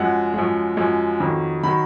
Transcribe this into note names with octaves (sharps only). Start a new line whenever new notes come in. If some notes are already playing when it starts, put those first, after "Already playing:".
Already playing: F#2 F3 G#3 F#5
F#2 F3 G#3
F#2 F3 G#3
F2 D#3 F#3
D#3 F#3 B5